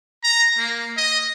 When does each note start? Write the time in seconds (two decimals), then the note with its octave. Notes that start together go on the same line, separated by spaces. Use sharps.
0.24 A#5
0.58 A#3
0.97 D#5